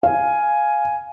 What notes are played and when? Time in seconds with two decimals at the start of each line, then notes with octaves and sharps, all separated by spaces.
0.03 F5 G#5